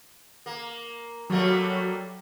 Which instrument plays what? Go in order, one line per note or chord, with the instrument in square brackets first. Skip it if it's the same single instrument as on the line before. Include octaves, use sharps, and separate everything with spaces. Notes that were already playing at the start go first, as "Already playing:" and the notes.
[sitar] A#3
[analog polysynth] F#3 [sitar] G3 A3 A#3